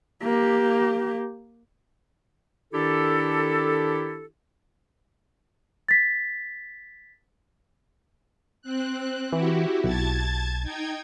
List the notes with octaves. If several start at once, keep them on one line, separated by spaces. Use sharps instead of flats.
A#3 G4
D#3 D4 E4 G4 A4
A6 B6
C4 F#6
E3 E4 F#4 G4
B1 A5 G#6 A6
D#4 G5 G#6